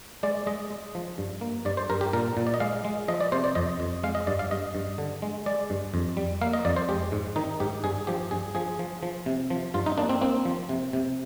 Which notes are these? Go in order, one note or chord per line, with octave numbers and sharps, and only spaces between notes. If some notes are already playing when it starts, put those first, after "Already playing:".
G#3 D5
G#3 D#5
G#3
F3
G2
A#3
G2 D5
C5
G2 A#4
G4
A#2 A#4
A#2
D5
D#5
G#3 F5
G#3
F3 D#5
D5
C3 C5
D5
F2 D#5
F2
G#3 F5
D#5
G2 D5
F5
G2 D#5
G2
D3
G#3
G#3 D5
G2
F2
G3
A#3 F5
D#5
F2 D5
C5
G#3 G4
G#2
D#3 D#4
G#2 G4
G2 G#4
F3 G4
G2 G#4
F3 G#4
F3
F3
C3
F3
G2 F4
D#4
A#3 D4
C4
A#3 C4
F3
C3
C3